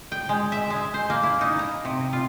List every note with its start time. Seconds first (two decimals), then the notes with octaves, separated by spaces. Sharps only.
0.12 G5
0.29 G#3
0.52 E5
0.70 G#3
0.94 C5
1.10 A#3
1.23 E4
1.41 D#4
1.59 A#5
1.85 C3
2.13 F4